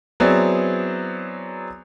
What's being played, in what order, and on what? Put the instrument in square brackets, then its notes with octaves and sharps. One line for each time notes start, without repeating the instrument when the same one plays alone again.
[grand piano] F#3 B3 C4 E4 G#4 D5